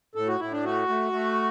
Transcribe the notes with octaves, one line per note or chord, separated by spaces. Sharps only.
A2 A4
F#4
A2 E4
D4
A3 F#4
A3
A3